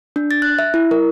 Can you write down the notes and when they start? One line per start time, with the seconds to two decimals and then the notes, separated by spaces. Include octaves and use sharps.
0.16 D4
0.31 A6
0.42 F#6
0.59 E5
0.74 E4
0.91 A#4